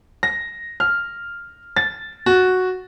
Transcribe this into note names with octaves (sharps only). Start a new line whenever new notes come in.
A#6
F6
A6
F#4